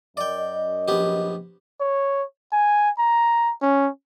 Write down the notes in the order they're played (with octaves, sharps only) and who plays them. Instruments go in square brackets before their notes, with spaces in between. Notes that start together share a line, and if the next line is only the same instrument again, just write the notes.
[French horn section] F#2 D#5 [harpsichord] D5 G5
[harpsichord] A#1 B3 G4
[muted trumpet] C#5
G#5
A#5
C#4